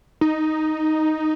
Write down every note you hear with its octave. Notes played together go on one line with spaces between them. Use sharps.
D#4